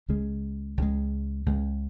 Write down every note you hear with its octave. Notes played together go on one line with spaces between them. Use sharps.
C#2 C#3 G#3
C#2 C#3 G#3
C#2 C#3 G#3